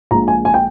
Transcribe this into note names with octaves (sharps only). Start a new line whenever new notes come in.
A#1 A#2 G#3 A#5
G#5
G#5
G5